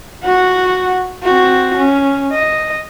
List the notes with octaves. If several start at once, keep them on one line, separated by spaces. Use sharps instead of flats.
F#4 F#5
C4 F#4
C#4
D#5